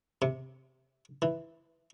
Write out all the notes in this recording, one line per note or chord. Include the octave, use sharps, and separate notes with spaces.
C3
E3